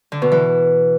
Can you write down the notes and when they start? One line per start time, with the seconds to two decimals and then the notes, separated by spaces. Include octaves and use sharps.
0.12 D3
0.22 B2
0.32 E3